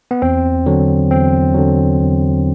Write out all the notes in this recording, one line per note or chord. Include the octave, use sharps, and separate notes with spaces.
B3
E2 C4
D3 F#3
E2 C4
D3 F#3
E2